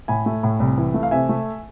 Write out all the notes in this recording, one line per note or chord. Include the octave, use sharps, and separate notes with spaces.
A2 G#5 B5
A3
A2
C2
E3
A3
F5
C3 E5 G#5
A3